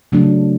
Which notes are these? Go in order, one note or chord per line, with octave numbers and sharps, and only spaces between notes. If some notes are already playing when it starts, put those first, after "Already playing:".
C#3 F#3 A3 D4